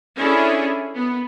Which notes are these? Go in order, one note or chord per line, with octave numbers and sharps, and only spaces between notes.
C#4 D4 E4 G#4 A4
B3